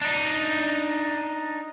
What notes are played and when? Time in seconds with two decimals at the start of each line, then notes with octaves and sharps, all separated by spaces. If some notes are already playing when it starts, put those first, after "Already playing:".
0.02 D4 D#4